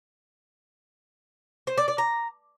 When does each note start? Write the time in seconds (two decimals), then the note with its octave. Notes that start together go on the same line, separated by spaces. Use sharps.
1.67 C5
1.78 D5
1.88 D5
1.98 A#5